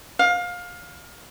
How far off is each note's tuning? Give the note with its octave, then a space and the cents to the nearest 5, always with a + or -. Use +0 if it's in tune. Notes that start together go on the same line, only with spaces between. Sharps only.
F5 +25